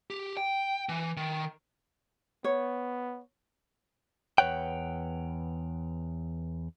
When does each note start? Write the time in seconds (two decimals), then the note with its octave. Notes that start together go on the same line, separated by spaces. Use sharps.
0.10 G4
0.37 G5
0.89 E3
1.17 D#3
2.44 B3 C#5
4.38 E2 B4 C#5 F#5 G5